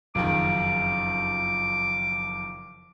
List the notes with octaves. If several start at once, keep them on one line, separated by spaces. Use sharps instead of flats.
F#1 F2 D#3 D6